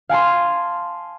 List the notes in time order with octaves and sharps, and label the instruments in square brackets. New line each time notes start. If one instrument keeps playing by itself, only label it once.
[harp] F5 G#5 A5 C6